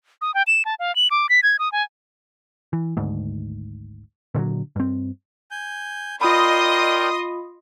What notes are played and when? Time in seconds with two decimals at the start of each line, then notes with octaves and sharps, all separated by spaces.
0.21 D#6
0.34 G5
0.47 E7
0.65 A5
0.80 F5
0.96 F#7
1.11 D6
1.29 B6
1.43 G#6
1.59 D#6
1.72 G#5
2.73 E3
2.97 G#1 D2 G#2
4.35 A#2 D3 F3 F#3
4.76 G2 C4
5.51 G#5 G6
6.21 F4 A#4 D5 D#5 G5 B5 C6 D#6